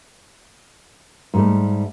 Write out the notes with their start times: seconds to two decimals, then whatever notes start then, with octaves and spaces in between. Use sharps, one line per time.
1.34 G#2 G3 A3